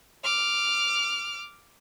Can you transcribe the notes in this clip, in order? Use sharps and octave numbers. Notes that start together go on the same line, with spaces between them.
D6 F6